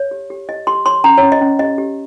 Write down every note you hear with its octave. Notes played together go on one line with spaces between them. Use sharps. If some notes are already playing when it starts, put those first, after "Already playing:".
Already playing: C#5
G4
G4
G4 D#5
G4 C6
C#5 C6
C#4 A#5
C#4 C#5
D#5
C#4
G4 D#5
G4